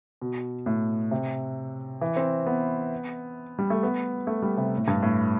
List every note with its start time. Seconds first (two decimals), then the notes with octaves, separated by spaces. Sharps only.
0.21 B2
0.66 A2
1.11 C3
2.01 E3
2.16 C4
2.47 B3
3.59 G3
3.70 A3
3.83 B3
4.27 A3
4.42 G3
4.57 C3
4.77 A2
4.88 G2
5.02 A2